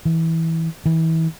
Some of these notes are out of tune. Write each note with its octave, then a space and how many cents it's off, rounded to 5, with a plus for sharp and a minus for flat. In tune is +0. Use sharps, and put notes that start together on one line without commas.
E3 -15
E3 -30